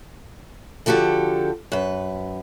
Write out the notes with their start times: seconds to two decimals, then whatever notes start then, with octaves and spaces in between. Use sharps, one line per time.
0.86 D3 F3 F#4 G4 A4
1.72 F#2 B4